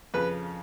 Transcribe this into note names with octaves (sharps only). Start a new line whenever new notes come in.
F2 C#3 B4